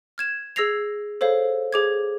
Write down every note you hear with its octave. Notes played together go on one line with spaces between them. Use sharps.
F6 G#6 E7
G#4 E6 G#6 A#6 C7 F7
A4 C5 C#5 F5
G#4 D6 G#6